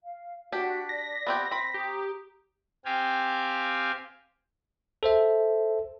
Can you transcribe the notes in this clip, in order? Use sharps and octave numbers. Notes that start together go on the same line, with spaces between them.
F5
D4 F#4 G4 F#5 B6
D5 A#6
B3 C4 G4
C4 B5 B6
G4 A#5 D#6
C4 G4 F5 G5 G#5
A4 C5 E5